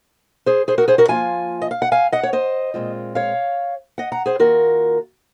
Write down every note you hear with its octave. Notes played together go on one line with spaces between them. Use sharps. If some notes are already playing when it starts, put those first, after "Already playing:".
G#4 C5
G#4 C5
F#4 A#4
G#4 C5
F#4 A#4
F3 A#3 F4 F5 G#5
D#5
F5
F#5
F5 G#5
D#5 F#5
C#5
C5 D#5
A#2 G#3 C4 F4
C#5 F5
D#5 F#5
F#5 A#5
G#4 C5
D#3 A#3 F4 F#4 A#4